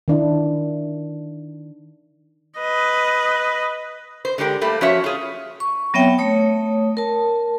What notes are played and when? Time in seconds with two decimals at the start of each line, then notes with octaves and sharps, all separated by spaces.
0.08 D#3 D4 E4
2.59 B4 D#5
4.25 C5
4.38 D3 G#3 G4 A#4 G5
4.61 G3 A3 A#3
4.81 F3 C#4 F#4 C#5 E5
5.04 F4 G#4
5.60 C#6
5.94 F#3 B3 C4 C#5 E5 G5
6.18 A3 C#5 D#6
6.97 A#4 A5